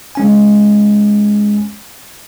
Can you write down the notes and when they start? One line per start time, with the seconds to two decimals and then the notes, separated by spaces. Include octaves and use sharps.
0.15 G#3 C#4 G#5